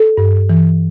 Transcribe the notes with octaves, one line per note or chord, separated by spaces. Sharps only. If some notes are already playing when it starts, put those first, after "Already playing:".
Already playing: A4
G2
E3